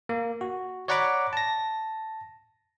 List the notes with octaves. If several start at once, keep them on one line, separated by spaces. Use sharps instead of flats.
A#3
F#4
C#5 D5 F#5 A#5 B5 D6
A5 A#6